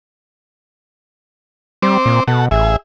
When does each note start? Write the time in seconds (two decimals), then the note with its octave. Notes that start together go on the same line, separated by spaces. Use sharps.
1.82 G3 C4 C5 D6
2.06 A#2
2.28 B2 A4 F#5
2.51 A1 G#4 E5